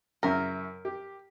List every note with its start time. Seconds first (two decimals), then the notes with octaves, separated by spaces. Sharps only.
0.23 F#2 C#3 E4 A#4
0.85 G4